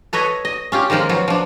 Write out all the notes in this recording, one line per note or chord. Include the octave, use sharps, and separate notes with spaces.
A4 B4 C#5 D#5
D#5
C#4 F4 G4
D#3 F3 G#3 A#3 F4
F3 F#3 B3
F3 D4